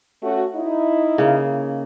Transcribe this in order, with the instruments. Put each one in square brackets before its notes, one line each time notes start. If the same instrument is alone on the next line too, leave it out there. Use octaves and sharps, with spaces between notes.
[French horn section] A3 C#4 F#4
D#4 E4
[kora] C#3 A#3